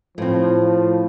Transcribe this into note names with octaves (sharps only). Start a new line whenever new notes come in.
A2 F3 C4